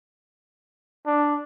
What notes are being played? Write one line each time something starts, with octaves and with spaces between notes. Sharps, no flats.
D4